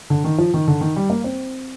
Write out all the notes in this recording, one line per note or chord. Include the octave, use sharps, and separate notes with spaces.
D3
D#3
F3
D#3
D3
D#3
G3
A#3
C4